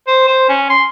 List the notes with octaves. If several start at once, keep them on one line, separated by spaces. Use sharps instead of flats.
C5
C5
C#4
C6